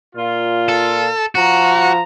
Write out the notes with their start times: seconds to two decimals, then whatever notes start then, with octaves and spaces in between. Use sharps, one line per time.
0.15 A#2 F4
0.69 A4
1.35 F3 F#4 A#5